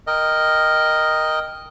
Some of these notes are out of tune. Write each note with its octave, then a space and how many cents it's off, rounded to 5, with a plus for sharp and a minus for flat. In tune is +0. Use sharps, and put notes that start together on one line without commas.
A#4 +0 D#5 +0 G5 +0